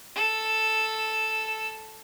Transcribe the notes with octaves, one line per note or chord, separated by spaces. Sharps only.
A4 E6